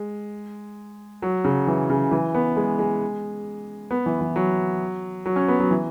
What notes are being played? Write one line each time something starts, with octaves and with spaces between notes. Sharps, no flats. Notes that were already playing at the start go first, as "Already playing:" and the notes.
Already playing: G#3
F#3
C#3
E3
C#3
E3
B3
G#3
G#3
B3
E3
E3
F#3
F#3
C#4
B3
F#3
E3